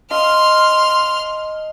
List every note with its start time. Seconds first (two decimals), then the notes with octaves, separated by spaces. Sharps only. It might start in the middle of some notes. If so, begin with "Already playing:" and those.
0.11 D#5 F5 A5 C6 F6